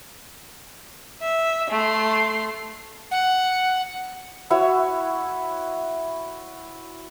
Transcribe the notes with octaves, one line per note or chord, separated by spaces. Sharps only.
E5
A3 C6
F#5
E4 F#4 C#5